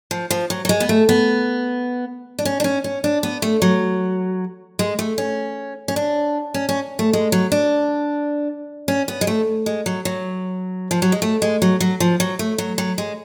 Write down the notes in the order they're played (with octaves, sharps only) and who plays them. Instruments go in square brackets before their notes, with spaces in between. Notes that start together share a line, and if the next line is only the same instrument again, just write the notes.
[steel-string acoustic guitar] F3
F3
F#3
F#3
G#3
B3
A3
B3
D4
C#4
D4
C#4
C#4
D4
B3
A3
F#3
G#3
A3
C#4
C#4
D4
C#4
C#4
A3
G#3
F#3
D4
C#4
B3
G#3
A3
G#3
F#3
F#3
F3
F#3
G#3
A3
G#3
F#3
F#3
F3
F#3
A3
F#3
F#3
G#3